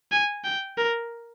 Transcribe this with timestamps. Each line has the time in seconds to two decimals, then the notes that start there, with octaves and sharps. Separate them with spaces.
0.12 G#5
0.44 G5
0.78 A#4